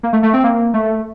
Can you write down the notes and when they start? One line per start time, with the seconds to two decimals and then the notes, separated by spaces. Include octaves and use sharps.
0.03 A#3
0.13 A3
0.23 A3
0.33 C4
0.44 A#3
0.74 A3